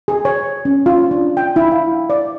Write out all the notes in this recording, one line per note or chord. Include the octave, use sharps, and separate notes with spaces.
G#4
C#5
C#4
F4
D4
G5
E4
F5
D5